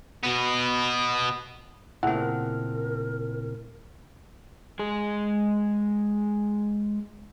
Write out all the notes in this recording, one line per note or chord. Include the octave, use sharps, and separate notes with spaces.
B2 B3
A#2 C#3 A3 C4 E4 A#4 F#5
G#3 G#4